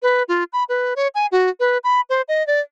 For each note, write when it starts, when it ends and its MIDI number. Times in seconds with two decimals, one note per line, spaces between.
0.03 0.23 71
0.28 0.44 65
0.53 0.64 83
0.69 0.94 71
0.96 1.08 73
1.15 1.26 80
1.32 1.49 66
1.60 1.78 71
1.84 2.01 83
2.10 2.22 72
2.28 2.45 75
2.47 2.61 74